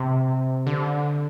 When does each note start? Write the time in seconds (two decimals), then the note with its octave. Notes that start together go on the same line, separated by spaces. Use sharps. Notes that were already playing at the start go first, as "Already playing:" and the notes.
Already playing: C3
0.67 D3